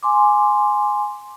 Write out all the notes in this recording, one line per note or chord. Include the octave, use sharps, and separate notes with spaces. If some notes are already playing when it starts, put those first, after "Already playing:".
G#5 C6 D6